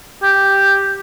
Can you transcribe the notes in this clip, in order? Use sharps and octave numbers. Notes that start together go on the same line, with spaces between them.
G4